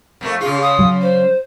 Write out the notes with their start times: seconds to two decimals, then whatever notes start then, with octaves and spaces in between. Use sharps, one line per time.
0.21 F2 A3 A#3
0.41 C#3 F4 G#4
0.62 D#6
0.79 F#3
1.02 C5